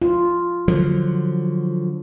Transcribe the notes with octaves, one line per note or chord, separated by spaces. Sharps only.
F4
D3 F3 F#3